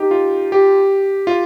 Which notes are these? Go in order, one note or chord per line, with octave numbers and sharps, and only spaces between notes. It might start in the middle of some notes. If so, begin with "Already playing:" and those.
Already playing: D#4 G4
F4
G4
F4